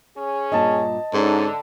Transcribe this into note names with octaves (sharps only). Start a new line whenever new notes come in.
C#4 G#4
G2 A#2 D4 D#5 A5
G#2 D3 C#4 D#4 A#4